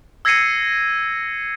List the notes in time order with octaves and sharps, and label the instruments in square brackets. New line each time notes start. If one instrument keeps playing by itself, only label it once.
[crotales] E6 G#6 A#6 C7 C#7 D#7